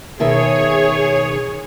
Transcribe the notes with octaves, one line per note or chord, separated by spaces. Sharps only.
B2 D#3 G#4 C#5 E5